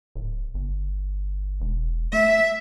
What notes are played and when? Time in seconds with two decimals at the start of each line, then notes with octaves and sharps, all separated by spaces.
0.15 D1
0.54 G1
1.60 E1
2.13 A3 E5